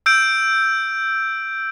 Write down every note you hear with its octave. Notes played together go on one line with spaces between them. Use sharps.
E6 G6 D7